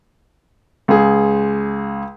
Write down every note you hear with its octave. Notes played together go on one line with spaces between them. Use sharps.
C#2 G#4